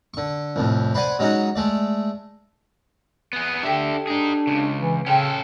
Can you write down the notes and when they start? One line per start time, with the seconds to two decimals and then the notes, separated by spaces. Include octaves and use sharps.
0.14 D3 C#6
0.56 C2 F2 A2
0.94 B4 C5 D5 F#5 G#5
1.19 F#3 G#3 C#4 D#4 F#4
1.55 G#3 A3 D5
3.33 B3 G#4
3.63 D3 D4 G4 A4 E5
4.07 D4 D#4 G#4
4.47 C#2 C#3
4.80 E3
5.06 C#3 C#4 A4 G5 C6 E6